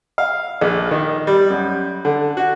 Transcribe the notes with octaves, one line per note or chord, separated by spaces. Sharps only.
F5
A#1
D#3
G3
F#2
D3
F#4